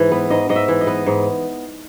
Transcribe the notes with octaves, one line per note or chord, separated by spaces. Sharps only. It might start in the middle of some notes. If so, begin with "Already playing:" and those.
Already playing: G#2 E3
B3
G#2 D#5
G#2 D#5
E5
E3
D#5
B3
G#2